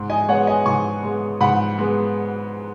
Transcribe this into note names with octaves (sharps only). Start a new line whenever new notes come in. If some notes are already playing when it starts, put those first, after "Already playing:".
Already playing: G#2
D#5 G#5
G#3 B3 C#5 F#5
D#5 G#5
G#2 G#5 C#6
G#3 B3
G#2 F#5 B5
G#3 B3